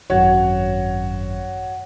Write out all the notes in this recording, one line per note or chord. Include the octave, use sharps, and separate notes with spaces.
G#1 F#2 F#4 C#5